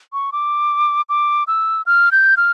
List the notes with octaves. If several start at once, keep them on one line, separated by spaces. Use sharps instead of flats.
C#6
D6
D6
E6
F6
G6
F6